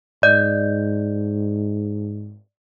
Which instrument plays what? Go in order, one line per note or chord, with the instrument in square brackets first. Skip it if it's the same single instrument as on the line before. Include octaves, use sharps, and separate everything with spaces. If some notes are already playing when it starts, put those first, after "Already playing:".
[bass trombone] G#2 [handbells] D5 D#5 G6